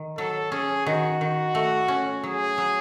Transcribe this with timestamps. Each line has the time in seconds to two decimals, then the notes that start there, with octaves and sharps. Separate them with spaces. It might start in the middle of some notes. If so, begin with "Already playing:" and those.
Already playing: D#3
0.18 F#3 A4
0.52 C#4 G#4
0.86 D#3 F#4
1.21 D#3
1.55 A3
1.88 C#4
2.23 F#3 G#4
2.58 F#3